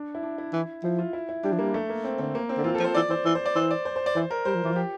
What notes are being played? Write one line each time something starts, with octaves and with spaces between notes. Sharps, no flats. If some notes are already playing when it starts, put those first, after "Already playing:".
Already playing: D4
E4
D4
E4
E3
F3 E4
F4
E4
E4
G3 D4
F3
G3 A#3
A3
A#3
C4
D3 C4
A#3
C4
D3
E3 F4
A4
F3
C5
E3 D5
E3 C5
E3 C5
C5
D5
E3 C5
D5
C5
C5
D5
E3 C5
A#4
G3 C5
F3
E3 F4
F3 G4